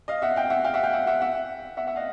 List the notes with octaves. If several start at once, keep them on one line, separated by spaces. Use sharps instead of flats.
D#5 F5
E5 F#5
F5 G5
E5 F#5
F5 G5
E5 F#5
F5 G5
E5 F#5
E5 F#5
E5 F#5
E5 F#5
E5 F#5
D#5 F5